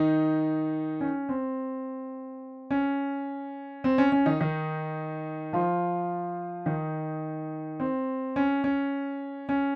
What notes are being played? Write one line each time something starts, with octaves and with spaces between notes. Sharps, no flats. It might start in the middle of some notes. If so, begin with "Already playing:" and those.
Already playing: D#3 D#4
C#4
C4
C#4
C4
C#4
C#4
D#3 D#4
D#3 D#4
F3 F4
D#3 D#4
C4
C#4
C#4
C#4